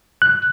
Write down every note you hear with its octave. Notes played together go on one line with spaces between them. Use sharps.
F#6